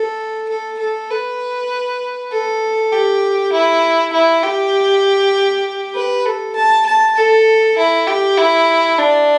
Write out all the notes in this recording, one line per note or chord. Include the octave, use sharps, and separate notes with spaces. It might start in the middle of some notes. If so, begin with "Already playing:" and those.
Already playing: A4
A4
A4
B4
A4
G4
E4
E4
G4
B4
A4
A5
A5
A4
E4
G4
E4
D4